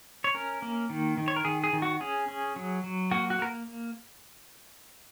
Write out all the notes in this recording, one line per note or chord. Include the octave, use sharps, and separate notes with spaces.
C#5
C#4 A#4
A#3
D#3
D#3
C#5
A#4
D#3 G#4
G#4
D#3
F#4
C#4 G#4
C#4
F#3
F#3
A#3 F#4
F#4
A#3 A#4